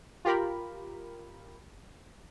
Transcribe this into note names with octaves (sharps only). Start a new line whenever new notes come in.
F4 G4 A#4 B5